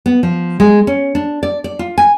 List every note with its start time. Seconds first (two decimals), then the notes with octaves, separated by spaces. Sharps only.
0.06 B3
0.23 F3
0.60 G#3
0.87 C#4
1.15 D4
1.43 D5
1.64 D5
1.79 F4
1.98 G#5